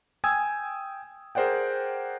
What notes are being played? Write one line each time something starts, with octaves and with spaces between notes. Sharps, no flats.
G5 G#5 D#6 E6 G#6
G#4 A#4 C5 D5 F#5 G5